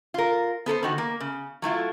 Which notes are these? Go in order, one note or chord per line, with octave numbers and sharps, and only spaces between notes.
F4 A#4
B3 A4 A#4 C5
D3 D#3 F#4
A#3
C#3
F#3 A3 E4 F4